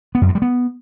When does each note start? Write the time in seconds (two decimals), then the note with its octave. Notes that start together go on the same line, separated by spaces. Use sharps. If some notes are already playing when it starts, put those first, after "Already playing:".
0.15 B3
0.22 F#2
0.28 G2
0.35 G3
0.42 B3